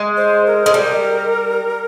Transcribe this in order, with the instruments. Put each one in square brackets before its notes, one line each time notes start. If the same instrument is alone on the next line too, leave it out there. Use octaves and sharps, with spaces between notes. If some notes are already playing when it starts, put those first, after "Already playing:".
Already playing: [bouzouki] G#3
[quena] C5
A#4
[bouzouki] G#3
G3